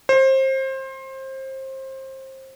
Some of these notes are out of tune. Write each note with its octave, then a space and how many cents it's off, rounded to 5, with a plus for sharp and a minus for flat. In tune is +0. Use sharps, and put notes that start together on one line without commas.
C5 +25